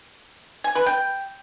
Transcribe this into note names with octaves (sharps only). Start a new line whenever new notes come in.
G#5
B4
G5